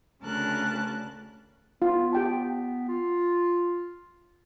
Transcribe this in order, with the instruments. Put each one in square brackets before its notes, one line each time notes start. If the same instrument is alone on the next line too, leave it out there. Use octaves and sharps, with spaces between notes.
[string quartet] D2 C#3 A#4 A5 F#6
[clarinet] B3 [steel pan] F4
[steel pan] G4 G5 A5
[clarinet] F4